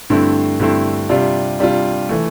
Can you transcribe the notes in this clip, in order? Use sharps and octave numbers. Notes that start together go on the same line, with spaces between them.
G2 D3 A3 C4 E4
G2 D3 A3 C4 E4
C3 G3 D4 F4
C3 G3 D4 F4
E3 A3